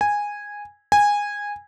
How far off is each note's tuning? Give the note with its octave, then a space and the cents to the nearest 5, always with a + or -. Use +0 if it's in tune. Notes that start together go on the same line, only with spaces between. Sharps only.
G#5 -10
G#5 -15